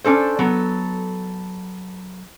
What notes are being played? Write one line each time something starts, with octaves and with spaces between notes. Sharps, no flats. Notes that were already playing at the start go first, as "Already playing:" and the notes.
C#4 D4 A4 C5
F#3 B3 A4